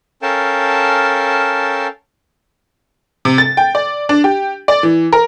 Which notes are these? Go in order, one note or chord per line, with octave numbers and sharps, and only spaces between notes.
C#4 A4 A#4 F5 G5 A5
C3
A6
G5
D5
D4
G4
D5
E3
A#4